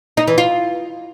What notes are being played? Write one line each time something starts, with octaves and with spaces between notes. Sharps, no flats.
D#4
E3
F4